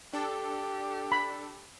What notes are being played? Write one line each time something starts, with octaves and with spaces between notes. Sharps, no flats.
D4 G4 A4
B5